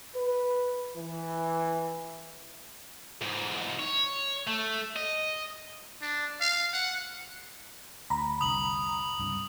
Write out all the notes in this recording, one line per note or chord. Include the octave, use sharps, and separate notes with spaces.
B4
E3
E2 G#2
C#5
A3
D#5
D4
F5
F#5
D2 A#5 B5
F1 C2 D3 D#6 F#7
C#2 G2 C3